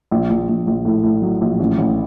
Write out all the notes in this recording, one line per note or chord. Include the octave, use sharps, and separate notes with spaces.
A#1
A#1
A#1
A#1
A2
A2
F#3
A#1
A1
A1